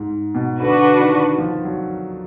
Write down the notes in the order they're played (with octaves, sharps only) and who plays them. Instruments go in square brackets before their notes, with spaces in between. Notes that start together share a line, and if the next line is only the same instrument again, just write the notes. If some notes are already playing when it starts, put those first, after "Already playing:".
Already playing: [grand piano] G#2
B2
[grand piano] D3 [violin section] D4 F#4 B4
[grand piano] D#3
F3
F#3